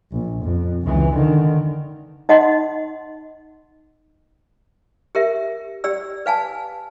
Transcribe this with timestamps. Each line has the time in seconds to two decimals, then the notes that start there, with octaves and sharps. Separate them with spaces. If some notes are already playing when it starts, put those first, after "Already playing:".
0.12 A#1
0.43 F2
0.83 C#2 E3
1.14 D3 D#3
2.29 D#4 D#5 F#5 C6
5.15 G4 A#4 E5
5.84 G4 D5 E6
6.26 B4 F5 G#5 A5